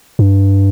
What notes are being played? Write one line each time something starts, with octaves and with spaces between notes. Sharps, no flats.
G2